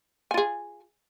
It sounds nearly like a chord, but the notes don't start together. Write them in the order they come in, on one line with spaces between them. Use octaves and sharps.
G#5 F4 G#4